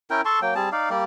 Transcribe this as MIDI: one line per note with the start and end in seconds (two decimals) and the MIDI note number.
0.10 0.21 61
0.10 0.21 64
0.10 0.21 70
0.10 0.21 79
0.25 0.40 69
0.25 0.40 81
0.25 0.40 84
0.25 0.40 85
0.42 0.54 54
0.42 0.54 58
0.42 0.54 79
0.55 0.69 55
0.55 0.69 60
0.55 0.69 68
0.55 0.69 81
0.72 0.90 63
0.72 0.90 74
0.72 0.90 77
0.90 1.04 55
0.90 1.04 58
0.90 1.04 67
0.90 1.04 74